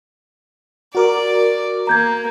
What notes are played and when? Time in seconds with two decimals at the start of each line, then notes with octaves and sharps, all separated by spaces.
0.95 F#4 A#4 D5 D6
1.87 A#3 A#5 G6 G#6